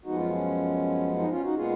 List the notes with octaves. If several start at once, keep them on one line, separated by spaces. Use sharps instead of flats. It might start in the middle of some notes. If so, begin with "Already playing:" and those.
F#2 F3 G#3 B3 D#4 F#4
C#4 F4
C#4
D#4
C#4 F4
D#4 F#4
A#2 G#3 B3 F4 G#4